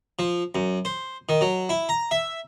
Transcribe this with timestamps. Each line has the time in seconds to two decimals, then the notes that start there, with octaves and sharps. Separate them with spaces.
0.19 F3
0.55 F#2
0.85 C5
1.29 D#3
1.41 F#3
1.69 E4
1.89 A#5
2.11 E5